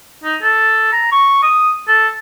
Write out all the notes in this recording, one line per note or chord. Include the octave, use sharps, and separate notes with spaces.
D#4
A4
A#5
C#6
D#6
A4